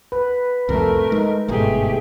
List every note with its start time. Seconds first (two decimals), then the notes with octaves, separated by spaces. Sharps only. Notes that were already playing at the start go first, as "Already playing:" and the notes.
0.12 B4
0.69 C2 F2 A2 A3 A#4
1.12 G#3 D#4
1.48 G1 G#2 B2 A3 G4 G#4